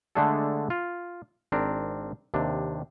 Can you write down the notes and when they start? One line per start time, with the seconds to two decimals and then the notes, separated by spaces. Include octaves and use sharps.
0.15 D3 G#3 A3 D4 G#4 A4
0.70 F4
1.52 G#1 C4 D4 A#4
2.34 D#2 C3 D4